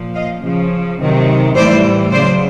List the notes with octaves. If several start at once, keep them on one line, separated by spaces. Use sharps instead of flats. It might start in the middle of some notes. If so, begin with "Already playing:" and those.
Already playing: A#2 F3
D#5 F5
C#3 F3
C3 D#3 F#3
A2 E3 G3 C5 D5
C#3 F#3 C5 D5